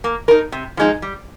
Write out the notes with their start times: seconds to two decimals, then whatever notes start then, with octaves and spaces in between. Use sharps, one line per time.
0.04 A#3
0.28 D#4 A#4
0.52 C3
0.77 F3 G#3 D#4
1.02 G3